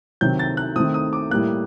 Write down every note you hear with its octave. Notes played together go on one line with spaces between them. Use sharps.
C3 D#3 F#3 C4 G6
A6
F#6
D#3 A3 C4 D#6
D#6
D6
A2 G3 A#3 F#6